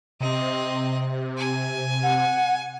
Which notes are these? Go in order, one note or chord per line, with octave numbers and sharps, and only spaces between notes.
C3 C4 D#5
G#5
F#5